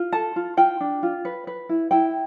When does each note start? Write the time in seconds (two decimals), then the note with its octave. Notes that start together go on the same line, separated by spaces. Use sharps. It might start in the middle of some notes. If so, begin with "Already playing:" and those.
Already playing: F4
0.13 A4 A5
0.36 F4
0.57 F4 G5
0.81 D4
1.03 F4
1.25 B4
1.47 B4
1.69 E4
1.91 E4 G5